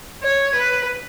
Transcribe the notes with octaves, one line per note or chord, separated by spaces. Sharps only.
C#5
B4